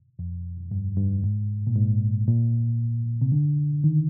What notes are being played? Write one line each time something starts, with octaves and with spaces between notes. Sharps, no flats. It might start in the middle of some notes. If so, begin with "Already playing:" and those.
F2
G2
G2
G#2
A#2
G#2
A#2
C3
D3
D#3